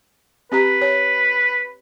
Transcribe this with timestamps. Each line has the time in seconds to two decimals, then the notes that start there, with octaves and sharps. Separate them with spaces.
0.52 C4 G4 B4 A#5
0.81 C#5